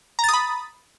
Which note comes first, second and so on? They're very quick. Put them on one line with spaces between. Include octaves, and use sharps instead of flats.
A#5 A6 D#6 B5